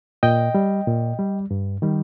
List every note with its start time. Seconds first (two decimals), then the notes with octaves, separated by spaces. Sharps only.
0.23 A#2 D#5 G5
0.55 G3
0.87 A#2
1.19 G3
1.51 G2
1.82 D#3 G3